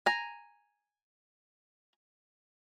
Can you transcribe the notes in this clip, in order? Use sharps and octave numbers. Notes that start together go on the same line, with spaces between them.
G#5 A#5